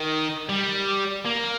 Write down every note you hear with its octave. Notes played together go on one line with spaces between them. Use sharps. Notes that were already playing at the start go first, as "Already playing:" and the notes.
Already playing: D#3
G3
A#3